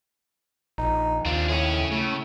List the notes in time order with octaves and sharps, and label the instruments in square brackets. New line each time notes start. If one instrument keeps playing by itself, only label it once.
[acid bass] A#1 [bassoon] D#4
[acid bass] D#2 [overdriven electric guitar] C4 D4 [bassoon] F4
[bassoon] A2 [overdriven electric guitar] C#4 G#4
[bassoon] A2 [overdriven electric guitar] C#3 [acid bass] A3